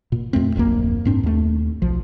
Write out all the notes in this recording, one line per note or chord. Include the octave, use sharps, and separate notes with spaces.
A#2
F2 A3 C4
D#1 A#1 F#2 A#3
G#2 C4 D4
D#2 A3
B1 F3